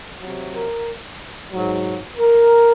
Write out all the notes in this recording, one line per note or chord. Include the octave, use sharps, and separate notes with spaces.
C3 F#3
A#4
G#2 F#3
A#4